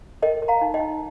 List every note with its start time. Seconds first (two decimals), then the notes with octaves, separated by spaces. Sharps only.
0.22 A#4 D#5 G5
0.42 A#4
0.48 F5 A#5
0.61 D#4
0.74 D#5 G5
0.80 D#4